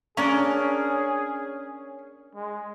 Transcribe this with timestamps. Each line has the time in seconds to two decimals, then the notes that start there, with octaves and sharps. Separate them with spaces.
0.17 A#3 C#4 D4 G#4 D5
2.35 G#3